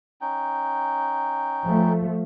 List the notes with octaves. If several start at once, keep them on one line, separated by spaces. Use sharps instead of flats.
C#4 D#4 G5
F3 A3